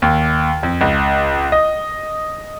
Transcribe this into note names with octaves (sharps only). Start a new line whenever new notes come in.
D#2
F2
C#2
D#5